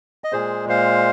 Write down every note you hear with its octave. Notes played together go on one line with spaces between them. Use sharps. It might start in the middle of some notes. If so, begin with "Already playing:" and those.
D#5
A#2 G#3 G#4 C5
C5 F5